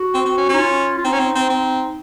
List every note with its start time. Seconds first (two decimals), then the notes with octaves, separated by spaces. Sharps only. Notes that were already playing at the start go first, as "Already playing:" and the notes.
Already playing: F#4
0.15 C4
0.26 C4
0.37 C#4
0.49 C#4 D#4
0.59 F4
0.98 F4
1.05 C4 D#4
1.13 C#4
1.20 C4
1.35 C4
1.50 C4